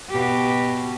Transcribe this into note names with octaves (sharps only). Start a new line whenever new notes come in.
B2 G4